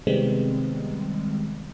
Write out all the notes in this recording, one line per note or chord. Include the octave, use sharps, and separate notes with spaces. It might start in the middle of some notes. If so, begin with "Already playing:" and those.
C3 D#3 G3 G#3 B3 C4